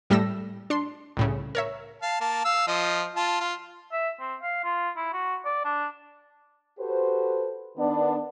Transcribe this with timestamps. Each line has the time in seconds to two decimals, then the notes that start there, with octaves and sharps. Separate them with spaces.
0.10 A2 G3 A3 A4 E6 A#6
0.70 D4 C6
1.17 C2 A2 C#3
1.55 A#4 C#5 E5
2.02 F5 A5
2.21 A#3 A5
2.45 F5 E6
2.68 F3 D#5
3.16 F4 A5
3.40 F4
3.92 E5
4.20 C4
4.43 F5
4.64 F4
4.97 E4
5.13 F#4
5.45 D5
5.65 D4
6.79 F#4 G4 A4 B4 C5
7.76 D#3 B3 D4